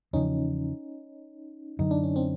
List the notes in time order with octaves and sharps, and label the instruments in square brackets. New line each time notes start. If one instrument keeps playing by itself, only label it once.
[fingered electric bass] E2 C#3 F3 [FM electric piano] C#4 D#4
[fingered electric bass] F#2 D3 F#3 [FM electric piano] D#4
[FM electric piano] D4
C#4
C4 D4